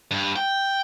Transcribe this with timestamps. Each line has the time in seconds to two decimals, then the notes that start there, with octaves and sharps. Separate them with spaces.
0.11 G2
0.36 G5